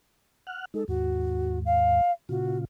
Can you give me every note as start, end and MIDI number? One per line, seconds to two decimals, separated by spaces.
0.47 0.65 78
0.47 0.65 89
0.47 0.65 90
0.74 0.85 56
0.74 0.85 63
0.74 0.82 69
0.88 2.01 39
0.88 2.01 44
0.88 1.58 66
1.65 2.11 77
2.29 2.65 46
2.29 2.65 49
2.29 2.65 65
2.29 2.57 66